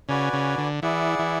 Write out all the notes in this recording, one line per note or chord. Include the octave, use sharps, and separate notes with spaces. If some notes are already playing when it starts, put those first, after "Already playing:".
C#3 F#4 B4 D5 G#5
C#3
D3
E3 E4 G#4 D5 F#5
E3